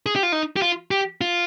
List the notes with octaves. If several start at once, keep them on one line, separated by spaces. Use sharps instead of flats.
G#4
G4
F4
D#4
G4
F4
G4
F4